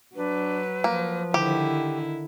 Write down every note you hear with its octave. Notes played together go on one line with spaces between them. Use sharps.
F#3 D4 B4
F3 A#3
D3 D#3 E4 G4